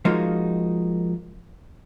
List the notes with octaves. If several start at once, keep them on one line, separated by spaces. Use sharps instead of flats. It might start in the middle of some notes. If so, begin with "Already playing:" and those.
F3 G#3 A#3 D#4 F4 F#4